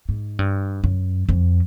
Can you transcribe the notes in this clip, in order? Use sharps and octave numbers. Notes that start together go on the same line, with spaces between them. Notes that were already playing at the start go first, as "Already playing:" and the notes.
G#2
G2
F#2
F2